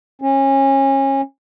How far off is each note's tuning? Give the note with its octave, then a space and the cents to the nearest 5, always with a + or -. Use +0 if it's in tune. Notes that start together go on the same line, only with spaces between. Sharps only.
C#4 -25